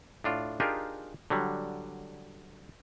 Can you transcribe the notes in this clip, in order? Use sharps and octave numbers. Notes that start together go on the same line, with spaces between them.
A2 D4 F4
D4 D#4 F4 G4 G#4 A#4
D3 F#3 G3